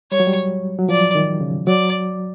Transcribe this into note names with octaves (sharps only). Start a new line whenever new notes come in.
G3 C#5
F#3
G3
F#3
F3 D5
D#3
C#3
F#3 D5